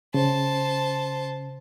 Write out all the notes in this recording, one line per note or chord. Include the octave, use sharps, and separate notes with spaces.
C#3 C5 A5